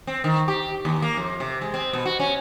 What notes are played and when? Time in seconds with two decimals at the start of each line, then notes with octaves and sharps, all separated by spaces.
0.07 C4
0.24 D#3
0.48 G4
0.85 D#2
1.02 A#3
1.17 F2
1.40 C3
1.61 G#3
1.74 C4
1.93 B2
2.05 F#4
2.20 C#4